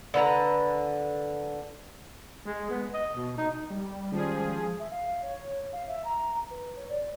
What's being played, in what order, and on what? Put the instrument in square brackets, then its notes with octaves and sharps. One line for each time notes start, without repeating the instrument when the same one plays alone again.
[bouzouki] D3 B4 F#5 A#5
[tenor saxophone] G#3
B3
D#5
B2
D#4
[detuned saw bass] G3
[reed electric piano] D#3 G#3 C#4 [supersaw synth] F3 G#4
[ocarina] E5
F5
C#5
F5
E5
A#5
B4
C#5
D5